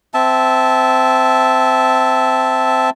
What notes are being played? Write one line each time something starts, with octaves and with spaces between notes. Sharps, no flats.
C4 E5 A5